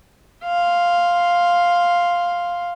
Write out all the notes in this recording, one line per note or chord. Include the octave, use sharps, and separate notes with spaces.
F5 C6